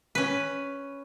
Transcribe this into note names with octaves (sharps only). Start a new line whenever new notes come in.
C#4 B4